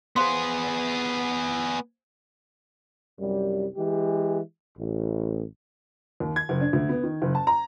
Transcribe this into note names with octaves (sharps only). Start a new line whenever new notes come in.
B3 G#4 C5 F5 C6
C2 F#2 G3
E3 G#3 G4
A1
D#2
G#6
F#1
D4
D2
B3
D#3
F#1
A5
A#5